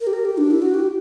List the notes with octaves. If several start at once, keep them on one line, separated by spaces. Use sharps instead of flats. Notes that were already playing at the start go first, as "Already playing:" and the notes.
A#4
G4
A#4
G4
D4
E4
F#4
G4